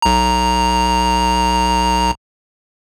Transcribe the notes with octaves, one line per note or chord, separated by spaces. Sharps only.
B1 A#5